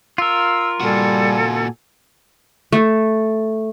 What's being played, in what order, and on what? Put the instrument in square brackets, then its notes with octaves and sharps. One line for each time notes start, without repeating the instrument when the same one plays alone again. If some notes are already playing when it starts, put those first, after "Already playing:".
[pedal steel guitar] F4 A#4 [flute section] E6
[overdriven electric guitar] A#2 F#4 [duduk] G3 [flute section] A4 G#5
[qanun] A3